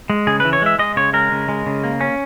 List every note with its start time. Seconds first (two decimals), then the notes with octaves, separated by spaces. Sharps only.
0.10 G#3
0.27 C#3 G#4
0.40 B4
0.45 E3
0.53 C#5
0.62 G#3 E5
0.79 G#3 D#5
0.96 C#3 C#5
1.13 G#3 A#4
1.32 C#3
1.48 G#3
1.66 C#3
1.84 A#3
2.01 C#4